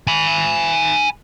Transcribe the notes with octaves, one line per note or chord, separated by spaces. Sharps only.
G#5 B5